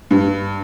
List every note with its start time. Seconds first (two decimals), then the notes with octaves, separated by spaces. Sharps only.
0.11 G2